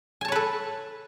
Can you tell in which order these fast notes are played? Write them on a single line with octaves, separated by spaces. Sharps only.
G#5 A5 C#5 B4 A4